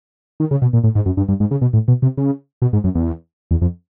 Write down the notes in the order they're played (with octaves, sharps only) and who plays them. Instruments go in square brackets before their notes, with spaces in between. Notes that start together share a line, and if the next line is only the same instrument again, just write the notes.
[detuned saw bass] D#3
C#3
B2
A#2
A2
G#2
F#2
G2
G2
G#2
C#3
B2
A2
B2
C3
C#3
B2
G#2
F#2
E2
E2
F2